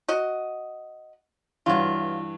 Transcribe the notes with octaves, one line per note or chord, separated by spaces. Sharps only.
F#4 D#5
G2 E3 F#3 F4